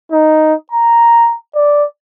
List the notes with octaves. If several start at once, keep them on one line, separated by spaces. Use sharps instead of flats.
D#4
A#5
D5